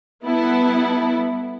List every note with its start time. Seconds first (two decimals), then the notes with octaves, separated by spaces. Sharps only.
0.24 G3 B3 E4 A4